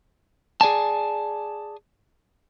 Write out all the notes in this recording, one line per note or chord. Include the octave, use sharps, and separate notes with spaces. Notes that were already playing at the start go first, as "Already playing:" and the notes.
G#4 D5 G#5 A5